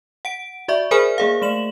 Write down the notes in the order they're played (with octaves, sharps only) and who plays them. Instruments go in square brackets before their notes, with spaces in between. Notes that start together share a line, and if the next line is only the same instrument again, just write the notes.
[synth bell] F#5 D7
F#4 D5 E5 C#6
G#4 A#4 C5 G#5 B5 F6
A#3 G#4 F5
A3 E7 F#7